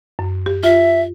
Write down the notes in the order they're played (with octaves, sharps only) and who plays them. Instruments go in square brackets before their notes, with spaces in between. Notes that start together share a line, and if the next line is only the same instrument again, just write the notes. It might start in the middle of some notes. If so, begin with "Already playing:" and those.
[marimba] F#2
G4
[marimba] F4 [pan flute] E5